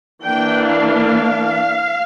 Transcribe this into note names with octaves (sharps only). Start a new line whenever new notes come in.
E3 A#3 D4 G5
F5